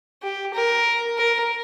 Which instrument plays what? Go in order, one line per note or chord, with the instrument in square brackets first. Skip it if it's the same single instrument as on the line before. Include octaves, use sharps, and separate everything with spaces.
[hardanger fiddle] G4
A#4
A#4